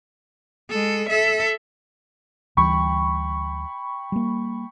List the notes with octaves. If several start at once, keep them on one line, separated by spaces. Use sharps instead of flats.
G#3 A4
A4 E5
D2 E3 G3 G5 B5 C#6
G3 A#3